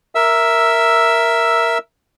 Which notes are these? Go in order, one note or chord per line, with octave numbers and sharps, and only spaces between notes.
A#4 E5 E6